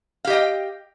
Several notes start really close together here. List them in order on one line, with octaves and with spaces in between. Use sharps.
F5 G4 D#5 G5